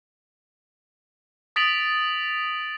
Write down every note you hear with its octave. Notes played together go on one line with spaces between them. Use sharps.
D#6 A6 B6 D7 F7 F#7